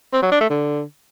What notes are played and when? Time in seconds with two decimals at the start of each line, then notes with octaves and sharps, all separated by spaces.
0.13 C4
0.22 F#3
0.32 D4
0.41 A3
0.50 D3